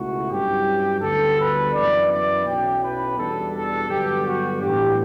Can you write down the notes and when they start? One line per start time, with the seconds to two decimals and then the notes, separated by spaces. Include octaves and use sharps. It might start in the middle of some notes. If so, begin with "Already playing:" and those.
Already playing: C#2 B2 A3 E4 F#4
0.30 G2 F#3 C#4 E4 G4
1.01 D2 D3 G3 B3 A4
1.37 B4
1.73 F#2 E3 B3 D5
2.09 D5
2.45 B1 B2 F#3 C#4 E4 G5
2.81 B4
3.16 E2 B2 G3 B3 D4 A4
3.53 A4
3.88 G2 D3 F#3 B3 G4
4.25 F#4
4.60 A2 E3 B3 D4 G4